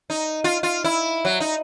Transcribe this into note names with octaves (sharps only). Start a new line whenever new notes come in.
D#4
F4
F4
E4
F#3
D#4